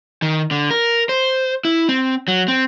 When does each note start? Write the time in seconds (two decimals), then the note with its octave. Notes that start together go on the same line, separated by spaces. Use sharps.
0.22 D#3
0.51 D3
0.71 A#4
1.09 C5
1.65 E4
1.89 C4
2.28 F#3
2.48 C4